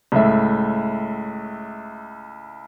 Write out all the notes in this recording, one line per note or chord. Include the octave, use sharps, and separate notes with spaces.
C#2 A2 E5